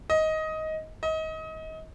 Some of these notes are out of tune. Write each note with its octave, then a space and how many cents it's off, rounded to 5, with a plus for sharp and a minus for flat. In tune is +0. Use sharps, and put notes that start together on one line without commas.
D#5 +15
D#5 +30